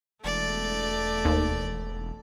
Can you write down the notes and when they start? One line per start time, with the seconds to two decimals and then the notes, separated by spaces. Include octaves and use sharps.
0.24 E1 A3 D5
1.25 D#2